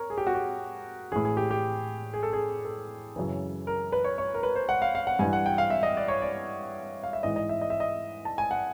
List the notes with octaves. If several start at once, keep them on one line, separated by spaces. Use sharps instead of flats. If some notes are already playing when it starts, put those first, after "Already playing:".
Already playing: A#4 C#5
G#4
G4
F#4
G4
A2 E3 G#4
G#4
G4
G4
G#4
A4
G#4
A4
F#2 C#3 E3
A#4
B4
C#5
C#5
A#4
B4
C5
F#5
F5
F5
F#5
G2 E3 G#5
F#5
G5
F5
E5
D#5
D5
C#5
D5
F5
E5
G#2 E3 D#5
D#5
E5
D#5
E5
D#5
A5
G#5
F#5